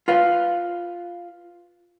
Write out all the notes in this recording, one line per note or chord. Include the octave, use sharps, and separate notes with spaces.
F4 B4 F5